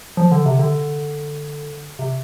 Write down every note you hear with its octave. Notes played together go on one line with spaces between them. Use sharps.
F3
D3
C3
D3
C3